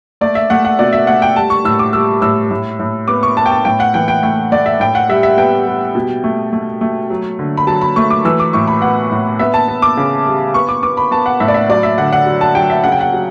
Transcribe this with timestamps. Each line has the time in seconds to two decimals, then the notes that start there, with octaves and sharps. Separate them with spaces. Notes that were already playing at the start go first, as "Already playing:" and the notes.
0.21 A3 D5
0.35 E5
0.50 A3 F#5
0.65 F#5
0.79 B2 D5
0.93 E5
1.07 A3 F#5
1.22 G5
1.36 G3 A5
1.50 C#6
1.65 A2 E6
1.79 D6
1.93 G3 E6
2.22 A2 E6
2.51 A2
2.79 A2
3.08 B3 D6
3.23 C#6
3.37 B3 A5
3.46 G5
3.51 A5
3.65 A2 G5
3.80 F#5
3.94 E3 G5
4.08 G5
4.23 A3 G5
4.51 A3 D5
4.66 E5
4.80 A2 G5
4.95 F#5
5.09 G3 E5
5.23 E5
5.38 B3 G5
5.66 G3
5.95 B2
6.24 A3
6.53 A3
6.81 A3
7.10 F#3
7.39 D3
7.57 B5
7.67 F#3 A5
7.81 B5
7.96 A3 C#6
8.10 D6
8.25 E3 E6
8.40 D6
8.53 A2 C#6
8.67 B5
8.82 B3 F#5
9.11 A2
9.39 B3 E5
9.54 A5
9.68 B3
9.82 D6
9.97 C#3
10.26 G3
10.54 B3 C#6
10.69 D6
10.83 B3 D6
10.97 B5
11.11 B3 A5
11.26 F#5
11.40 A2 E5
11.48 D5
11.54 E5
11.69 F#3 D5
11.83 E5
11.98 D3 F#5
12.13 F#5
12.26 F#3
12.41 A5
12.55 F#3 G5
12.70 E5
12.84 C#3 F#5
12.92 G5
13.01 F#5
13.13 F#3